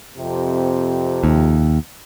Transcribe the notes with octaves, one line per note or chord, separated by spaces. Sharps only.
F2 C3
D#2